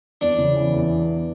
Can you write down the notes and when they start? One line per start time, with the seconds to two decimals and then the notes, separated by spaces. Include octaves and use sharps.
0.21 E2 D4
0.39 C#3
0.56 E3
0.74 E2